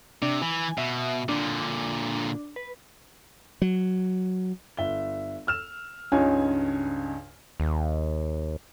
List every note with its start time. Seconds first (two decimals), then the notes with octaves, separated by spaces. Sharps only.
0.22 C3 D4
0.42 E3 G#5
0.78 B2 E5
1.29 A#2 D3 D4
2.56 B4
3.62 F#3
4.77 G1 E5 G7
5.47 E6 F6 E7
6.12 C#2 G2 C#3 D#4 C#5 G#5
7.60 D#2